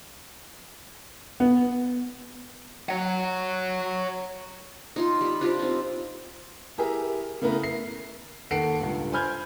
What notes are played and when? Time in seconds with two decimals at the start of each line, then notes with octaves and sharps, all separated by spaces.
1.40 B3
2.89 C#5 F#5
4.96 D#4 F4 C6
5.21 G3 B5
5.41 D4 F4 G4 C5
5.59 C4 D#4
6.78 E4 G4 G#4 A#4 E5
7.42 C#3 A3 B3 E4 A#4 B4
7.63 C7
8.51 D#2 A4 F#5 C7 D7
8.80 C#2 G2
9.12 C5 G#5 B5 F6 G6 G#6